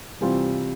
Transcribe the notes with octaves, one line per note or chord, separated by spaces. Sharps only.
C3 E3 G3 C4 F4